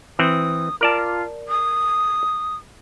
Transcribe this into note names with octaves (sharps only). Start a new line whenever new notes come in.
E3 C4 D#6
F4 A#4 D5 A5
D#6